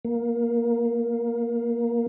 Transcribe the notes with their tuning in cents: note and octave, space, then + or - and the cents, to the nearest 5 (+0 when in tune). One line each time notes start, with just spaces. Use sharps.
A#3 +10